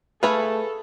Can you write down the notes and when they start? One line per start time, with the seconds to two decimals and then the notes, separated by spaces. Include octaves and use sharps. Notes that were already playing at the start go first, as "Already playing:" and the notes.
0.23 A3 G#4 A4 B4 E5 F5